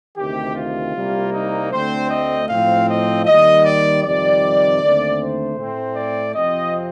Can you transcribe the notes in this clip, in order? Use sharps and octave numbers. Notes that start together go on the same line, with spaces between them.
D2 C3 D#3 G4
F4
C2 C3 G3 A#3
D#4
D2 D3 A3 C4 C5
D#5
A2 F3 C4 F5
D#5
D#2 D#3 G3 D#5
D5
F2 C3 D#3 G3 D5
D#2 D3 A3 C4
C5
A2 A3 C4
D5
F2 C3 F3 C4 D#5